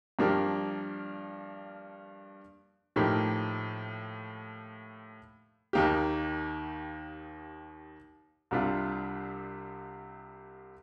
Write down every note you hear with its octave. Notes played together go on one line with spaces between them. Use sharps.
G2 F3 A#3 D4 G4
A2 F3 A#3 D#4 G4
D#2 D#3 A#3 D#4 G4
C2 C3 G3 D4 F4